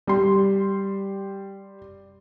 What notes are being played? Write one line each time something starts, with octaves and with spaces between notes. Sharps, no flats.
G3 C6